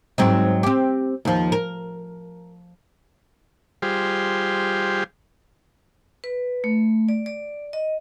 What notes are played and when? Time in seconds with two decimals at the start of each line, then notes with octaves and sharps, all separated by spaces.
0.18 G#2 F#3 C4
0.63 C4 G4
1.25 D#2 F3
1.52 A#4
3.82 G3 F4 G4 G#4 C5
6.24 B4
6.64 A3
7.09 D5
7.26 D5
7.73 D#5